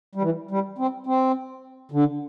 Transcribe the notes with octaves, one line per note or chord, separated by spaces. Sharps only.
G3
E3
G3
C4
C4
D3